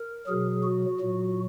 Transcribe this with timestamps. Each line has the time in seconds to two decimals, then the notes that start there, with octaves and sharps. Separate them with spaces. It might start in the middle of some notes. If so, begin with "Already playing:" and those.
Already playing: A#4
0.27 B2 F#3 G#4
0.64 F#4
1.00 A#2 F#3